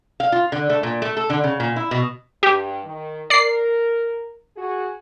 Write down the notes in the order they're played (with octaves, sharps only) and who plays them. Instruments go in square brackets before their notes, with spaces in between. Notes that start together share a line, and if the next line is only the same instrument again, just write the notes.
[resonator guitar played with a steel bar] F5
F4
D3
A3
A#2
A3
A4
D3
C#3
A#2
E4
B2
[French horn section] G2 [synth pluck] G4
[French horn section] D#3
[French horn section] A#4 [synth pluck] D5 C7
[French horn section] F#4 G#4